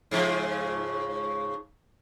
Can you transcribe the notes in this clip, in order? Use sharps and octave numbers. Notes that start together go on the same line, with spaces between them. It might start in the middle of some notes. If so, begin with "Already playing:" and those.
G#2 C#3 F3